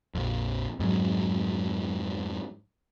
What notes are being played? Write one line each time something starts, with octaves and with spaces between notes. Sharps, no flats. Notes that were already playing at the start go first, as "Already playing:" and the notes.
A#1 F2
F2 G#2 F#3